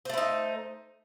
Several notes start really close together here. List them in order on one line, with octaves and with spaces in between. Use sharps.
C5 A3 E4 D#4